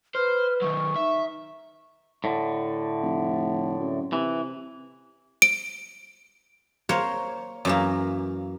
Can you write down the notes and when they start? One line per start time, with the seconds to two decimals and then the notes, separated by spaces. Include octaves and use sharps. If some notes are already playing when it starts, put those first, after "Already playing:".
0.15 B4 C5 F6
0.62 D#3 F#3 C#6
0.96 D#4 E5
2.24 A2 D3
3.02 F1
3.80 F#2
4.13 C3 E3
5.42 D7
6.89 A#3 A#4 C5 C#5
7.65 F#2 E3 A#3